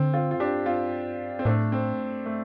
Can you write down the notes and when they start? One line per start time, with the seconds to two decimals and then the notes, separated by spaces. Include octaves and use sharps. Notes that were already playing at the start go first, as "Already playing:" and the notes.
Already playing: D3 C4
0.14 C4 F4
0.31 F4
0.40 D4 G4
0.66 C4 F4
1.39 C4
1.45 A2 A3 D4
1.72 C4
2.26 A3